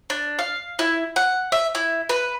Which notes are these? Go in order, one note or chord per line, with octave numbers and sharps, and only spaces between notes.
D4
F5
E4
F#5
E5
E4
B4